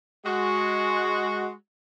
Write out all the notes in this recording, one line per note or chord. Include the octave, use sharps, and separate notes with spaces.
G#3 F#4